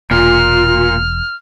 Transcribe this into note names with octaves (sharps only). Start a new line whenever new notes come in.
E1 A#2 F4 F6